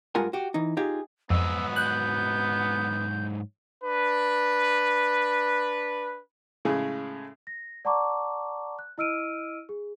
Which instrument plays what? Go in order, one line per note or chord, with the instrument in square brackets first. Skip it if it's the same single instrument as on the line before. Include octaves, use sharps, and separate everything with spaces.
[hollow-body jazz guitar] G2 G#3 F4 A#4 F#5 G#5
F#4 G4
E3 D#4
D#4 F4 G4 G#4
[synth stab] F2 [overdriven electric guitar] G#2 F#3 [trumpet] B3 [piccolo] E6
[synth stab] F#6 [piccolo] G6
[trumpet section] D4 B4
[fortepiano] A2 C#3 G#3 G#4
[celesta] A#6
D5 F#5 A5 A#5 C#6 D6
F#6
E4 D#5 E6 F6 D7 D#7
G#4